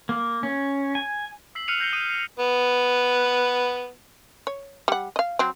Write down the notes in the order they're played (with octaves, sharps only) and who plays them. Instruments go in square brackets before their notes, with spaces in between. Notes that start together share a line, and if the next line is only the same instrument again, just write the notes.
[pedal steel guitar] A#3
C#4
G#5
[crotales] E6 B6 C7 F#7
F6 F#6 C7 C#7 D#7 F7
G6 A#6 C7 C#7 G7
D#6 D#7 G7
C7
[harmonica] B3 B4
[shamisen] C#5
G3 F#5
D#5 F5
F#3 C4